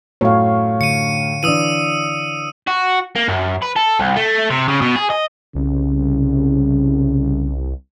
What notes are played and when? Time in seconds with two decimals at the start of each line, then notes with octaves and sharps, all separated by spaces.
0.21 F#2 A2 A3 C#5 F5
0.81 D3 C#7 D#7
1.43 E3 D4 D#6 E6 D#7
2.67 F#4
3.16 A#3
3.28 F#2
3.63 B4
3.76 A4
3.99 C2
4.16 A3
4.50 C3
4.68 C#3
4.81 B2
4.96 G#4
5.10 D#5
5.55 C2 C#3